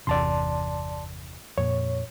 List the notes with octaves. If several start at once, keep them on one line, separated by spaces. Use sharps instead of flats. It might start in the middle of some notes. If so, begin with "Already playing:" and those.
G1 E2 C3 D5 A5 C6
F2 A#2 C#5